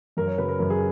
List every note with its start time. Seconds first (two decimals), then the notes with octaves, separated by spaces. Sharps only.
0.17 F#2 A#4
0.27 C#5
0.38 C#3 F#3 B4
0.49 A#4
0.59 F#2 A#4
0.70 G#4